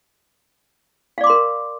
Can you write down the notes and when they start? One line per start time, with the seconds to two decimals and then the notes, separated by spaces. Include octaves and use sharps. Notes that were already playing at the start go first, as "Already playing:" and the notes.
1.18 F5
1.21 D5
1.24 D6
1.27 C6
1.30 A#4